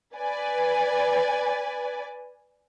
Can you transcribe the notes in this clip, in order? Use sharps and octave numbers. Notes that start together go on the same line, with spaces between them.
B4 D5 G#5